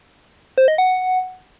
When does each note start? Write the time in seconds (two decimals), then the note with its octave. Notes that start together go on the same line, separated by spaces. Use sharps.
0.58 C5
0.68 D#5
0.78 F#5